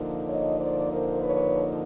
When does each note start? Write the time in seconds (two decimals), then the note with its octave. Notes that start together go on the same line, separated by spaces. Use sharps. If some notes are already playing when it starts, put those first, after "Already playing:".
Already playing: D3 F3 A#3 D#4
0.28 C#5 D#5
0.59 C5 D5
0.91 A#4 C5
1.23 B4 C#5